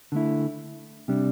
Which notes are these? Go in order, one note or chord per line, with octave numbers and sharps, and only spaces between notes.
D3 A3 E4
C3 G3 D4